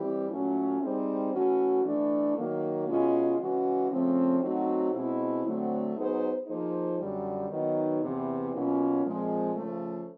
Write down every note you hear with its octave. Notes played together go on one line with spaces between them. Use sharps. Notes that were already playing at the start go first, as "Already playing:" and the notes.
Already playing: E3 G3 C4 E4 G4
A#2 F#3 A3 C#4
G3 C4 D#4 G#4 C5
E3 A3 C#4 F#4
E3 A3 D4
D#3 F#3 A#3
B2 G#3 C#4 F4
C#3 E3 G#3 C#4 F#4
C#3 F3 A3 C4
F#3 A3 C4 D#4 F#4
B2 G#3 C4 E4
D3 F#3 A3 C4
F#3 B3 D#4 G#4 C5
F3 A#3 D#4 G#4 C5
F#2 D3 G3
D#3 F#3 B3 D#4
E2 C3 E3
B2 F#3 A#3 C#4 F4
A#2 F3 G#3 C4
C#3 F3 A3